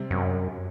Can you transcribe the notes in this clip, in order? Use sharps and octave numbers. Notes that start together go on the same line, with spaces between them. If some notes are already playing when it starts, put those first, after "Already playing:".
Already playing: C3 G3 C4
F#2